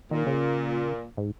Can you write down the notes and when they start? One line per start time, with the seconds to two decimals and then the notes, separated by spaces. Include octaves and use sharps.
0.11 A#2 D#3
0.26 C#3
1.17 G#2